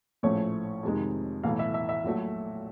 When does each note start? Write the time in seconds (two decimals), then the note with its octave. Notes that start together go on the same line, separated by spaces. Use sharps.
0.23 A#1 A2 F3 A3 C#4 C#5
0.83 F2 C3 D#3 G#3
1.44 B1 A2 E3 A3 F5
1.59 E5
1.74 E5
1.89 E5
2.04 A#1 A#2 F#3 A3